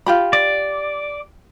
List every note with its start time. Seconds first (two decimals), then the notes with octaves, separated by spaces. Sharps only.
0.06 F4 G4 B5
0.33 D5